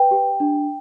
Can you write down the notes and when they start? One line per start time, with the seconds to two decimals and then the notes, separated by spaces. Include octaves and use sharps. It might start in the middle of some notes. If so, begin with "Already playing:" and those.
Already playing: B4 G5
0.11 G4
0.40 D4